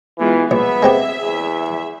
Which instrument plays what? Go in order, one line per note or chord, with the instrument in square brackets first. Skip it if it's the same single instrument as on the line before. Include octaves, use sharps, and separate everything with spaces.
[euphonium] E3 [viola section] G#3 B3 F4
[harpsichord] A#1 [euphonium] B3 [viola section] G#4 E5
[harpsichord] G#3 C4 G4
[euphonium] E2